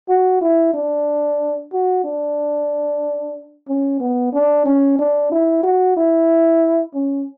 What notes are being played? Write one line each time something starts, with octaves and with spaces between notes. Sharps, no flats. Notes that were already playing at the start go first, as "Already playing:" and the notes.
F#4
E4
D4
F#4
D4
C#4
B3
D4
C#4
D4
E4
F#4
E4
C#4